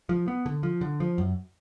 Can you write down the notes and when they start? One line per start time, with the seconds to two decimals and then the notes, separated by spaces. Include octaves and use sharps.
0.09 F3
0.28 B3
0.46 D3
0.63 F3
0.81 D3
1.00 F3
1.18 F#2